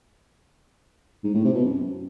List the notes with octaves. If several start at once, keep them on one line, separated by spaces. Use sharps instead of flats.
G#2
A2
C3
B2
F#2